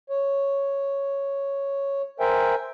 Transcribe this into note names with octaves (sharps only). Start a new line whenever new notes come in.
C#5
A#4 C5 E5 G5 G#5